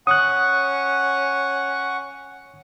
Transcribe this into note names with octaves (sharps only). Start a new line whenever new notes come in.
C#4 F#5 C#6 D#6 F#6